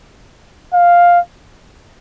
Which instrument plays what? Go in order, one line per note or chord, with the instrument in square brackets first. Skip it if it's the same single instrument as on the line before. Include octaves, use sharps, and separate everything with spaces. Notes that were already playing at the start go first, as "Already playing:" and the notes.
[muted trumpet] F5